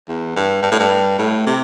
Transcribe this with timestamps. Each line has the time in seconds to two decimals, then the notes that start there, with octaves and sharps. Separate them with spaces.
0.09 E2
0.36 G2
0.63 G2
0.72 A2
0.80 G2
1.19 A2
1.46 C3